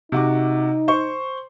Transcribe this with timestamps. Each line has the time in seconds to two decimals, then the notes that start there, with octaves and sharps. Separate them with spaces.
0.12 C3 D#4 F#4 D6
0.88 C5 C#6